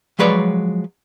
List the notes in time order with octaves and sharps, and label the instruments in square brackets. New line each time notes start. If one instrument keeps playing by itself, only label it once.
[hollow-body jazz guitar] F3 F#3 G#3 B4 C#5 D5